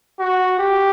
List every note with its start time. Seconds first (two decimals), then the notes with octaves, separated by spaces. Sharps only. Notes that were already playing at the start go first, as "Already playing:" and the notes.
0.20 F#4
0.59 G4